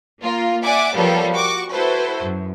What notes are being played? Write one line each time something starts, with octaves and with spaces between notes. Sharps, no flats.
A#3 F4 A#4
D5 E5 F#5 G#5 D6
F3 G3 A#3 B3 A4 C#5
F#4 C#6 D6
E4 F#4 A4 B4 C5
F#2